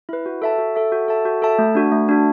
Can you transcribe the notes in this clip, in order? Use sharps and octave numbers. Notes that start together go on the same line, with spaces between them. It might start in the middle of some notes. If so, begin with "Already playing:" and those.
E4 B4
F#4
A4 E5 A5
F#4
A4 E5 A5
F#4
A4 E5 A5
F#4
A4 E5 A5
A3
D4 F#4
A3
D4 F#4